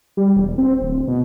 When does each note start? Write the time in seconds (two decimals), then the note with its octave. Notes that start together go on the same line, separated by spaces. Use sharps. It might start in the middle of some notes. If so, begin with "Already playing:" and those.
0.17 G3
0.36 E1
0.58 C4
0.81 D1
1.07 B2